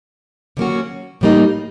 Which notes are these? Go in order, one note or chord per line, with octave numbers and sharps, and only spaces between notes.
D3 F#3 A#3 C#4 F#4
A2 E3 G3 A#3 D#4